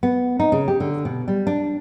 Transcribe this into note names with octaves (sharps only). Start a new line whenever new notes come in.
B3
D#4
C#3
G4
D3
B2
G3
D4